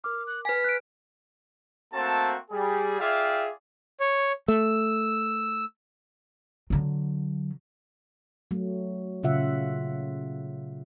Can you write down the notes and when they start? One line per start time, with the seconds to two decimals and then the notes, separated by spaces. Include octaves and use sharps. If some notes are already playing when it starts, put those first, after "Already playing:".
0.04 A#4 D6 F6
0.27 F#6
0.45 B4 G#5 B6
0.64 F#6 D7
1.93 A3 A#3 C4 F#4 A5
2.51 G3 G#4
3.00 F4 G#4 D5 E5 F5 G5
4.00 C#5
4.48 A3 E6
6.70 D3 F#3
8.51 F#3 A3
9.23 A#2 C#3 F4 E5 F#5